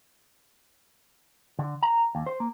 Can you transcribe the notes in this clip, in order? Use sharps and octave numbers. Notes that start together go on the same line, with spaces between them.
D3
A#5
D#2
C5
A#3